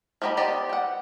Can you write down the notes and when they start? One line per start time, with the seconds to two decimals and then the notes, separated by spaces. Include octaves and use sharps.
0.22 F3 A#3 G4 D#5 B5
0.37 B3 G4 C5 D5 D#5
0.69 F#5 G5